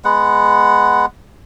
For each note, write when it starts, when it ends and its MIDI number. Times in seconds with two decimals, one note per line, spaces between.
0.05 1.06 56
0.05 1.06 59
0.05 1.06 78